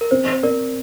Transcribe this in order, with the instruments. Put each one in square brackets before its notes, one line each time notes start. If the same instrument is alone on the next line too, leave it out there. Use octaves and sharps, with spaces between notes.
[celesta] A#4
[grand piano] C4 [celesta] C5
[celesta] C5
[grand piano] C4 [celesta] A#4 D5